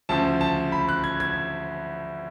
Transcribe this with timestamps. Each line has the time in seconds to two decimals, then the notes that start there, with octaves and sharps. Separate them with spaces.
0.09 D2 C#3 F3 A5
0.41 A5
0.72 B5
0.89 F#6
1.04 G#6
1.20 G#6